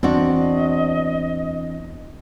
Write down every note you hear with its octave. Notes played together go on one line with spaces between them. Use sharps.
E2 C4 D4 F#4 D#5